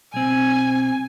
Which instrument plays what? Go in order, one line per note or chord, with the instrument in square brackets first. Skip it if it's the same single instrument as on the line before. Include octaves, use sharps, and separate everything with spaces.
[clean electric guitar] B1 C4 [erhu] G#5